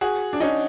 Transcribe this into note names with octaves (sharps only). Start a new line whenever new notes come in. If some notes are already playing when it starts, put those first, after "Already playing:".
F#4 G#4
D4
C#4 D#4